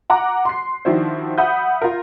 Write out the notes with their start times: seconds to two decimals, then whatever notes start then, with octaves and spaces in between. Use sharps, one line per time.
0.10 F#5 A#5 D6 F#6
0.45 C6 C7
0.85 D#3 F3 D4 E4 F#4 C5
1.38 E5 F#5 B5 D#6 G6
1.82 F4 A#4